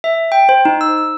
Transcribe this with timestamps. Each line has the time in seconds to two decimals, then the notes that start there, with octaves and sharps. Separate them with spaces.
0.04 E5
0.32 G5
0.49 C5
0.65 D#4
0.81 E6